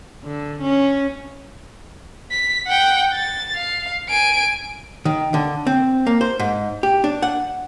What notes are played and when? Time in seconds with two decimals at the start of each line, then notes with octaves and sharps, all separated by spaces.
0.24 D3
0.62 C#4
2.31 B6
2.67 F#5 G5
3.14 A6
3.55 F5
4.09 G#5 D7
5.05 D#3
5.34 D3
5.67 C4
6.07 A#3
6.21 C5
6.40 G#2
6.83 G4
7.04 D4
7.22 F#5